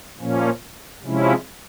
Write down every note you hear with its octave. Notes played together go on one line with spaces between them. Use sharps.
A#2 F3 A#3 C#4
C3 F3 G#3 C#4 E4